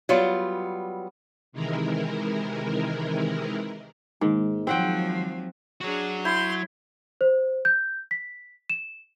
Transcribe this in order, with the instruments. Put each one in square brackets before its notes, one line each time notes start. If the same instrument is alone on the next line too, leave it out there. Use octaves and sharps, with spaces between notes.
[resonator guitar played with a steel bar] F#3 G3 B3 F4
[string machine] C3 D#3 E3 G#3 E4 A#4
[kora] G#2 [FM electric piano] D#3 G#3 A#3
[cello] F3 F#3 [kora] C4 F#5 G5
[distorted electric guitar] F#3 F#4 [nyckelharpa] D4 G#4
[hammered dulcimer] E4 [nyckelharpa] C6 [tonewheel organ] G6
[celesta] C5
G6
B6
E7